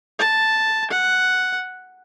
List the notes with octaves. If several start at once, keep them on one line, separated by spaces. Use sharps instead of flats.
A5
F#5